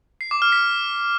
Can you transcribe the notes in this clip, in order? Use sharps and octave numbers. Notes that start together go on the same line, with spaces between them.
C7
D6
F6
B6